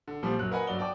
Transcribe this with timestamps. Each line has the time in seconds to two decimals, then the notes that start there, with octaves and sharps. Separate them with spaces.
0.08 D3
0.23 A#2 F3 G3
0.39 F#1 F#3 F#6
0.51 A#4 B4 D#5 F#5 G#5 B5
0.67 G1 F#3 D5 G7
0.79 D5 G5 A5 D6 D#6